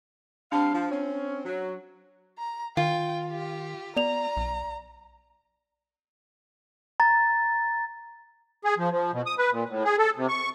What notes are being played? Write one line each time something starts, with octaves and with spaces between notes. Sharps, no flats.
G3 C4 D4 F5 A5
F3
C4 C#4
F#3
A#5
D#3 F4 G5
G4
B3 D5 A#5 F7
B1
A#5 A6
G#4
F3
F3
B2
D#6
B4
A#2
A2
G#4
A4
C3
C#6